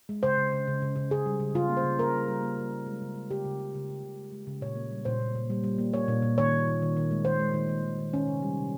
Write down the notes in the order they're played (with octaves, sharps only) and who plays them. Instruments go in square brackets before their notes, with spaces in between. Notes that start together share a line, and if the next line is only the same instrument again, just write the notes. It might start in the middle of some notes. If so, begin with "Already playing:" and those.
[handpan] G#3
C#3 C5
C#3
C#3
C#3
C#3
C#3
C#3 G#4
G3
C#3
C#3 F4
A#3
C5
C#3
A#3 A#4
G3
G3
A#3
A#3
A#3
G#3
C#3
G#3
C#3 G4
C#3
C#3
C#3
C#3
C#3
G#3
G#3
C#3
A#2 C#5
A#3
G3
A#2 C5
A#2
A#2
G3
G3
A#3
A#3 C#5
A#2
A#2
D#3 C#5
D#3
D#3
D#3
D#3
G#3
D#3 C5
G#3
D#3
D#3
D#3
D#3
D#3 C#4
C3
G3
C3